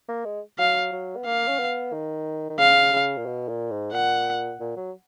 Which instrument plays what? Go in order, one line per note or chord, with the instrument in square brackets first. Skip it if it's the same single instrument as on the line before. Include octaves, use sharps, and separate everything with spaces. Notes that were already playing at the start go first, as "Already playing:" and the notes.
[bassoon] A#3
G#3
[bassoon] F#3 [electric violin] F5
[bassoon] F#3
B3
[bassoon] A#3 [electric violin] F5
[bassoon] C#4
B3
D#3
D#3
[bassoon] C#3 [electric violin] F5
[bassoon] C#3
A#2
B2
A#2
G#2
[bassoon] A#2 [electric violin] F#5
[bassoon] A#2
F#3